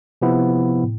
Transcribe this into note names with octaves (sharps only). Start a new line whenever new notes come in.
C3 F3 B3 E4
A2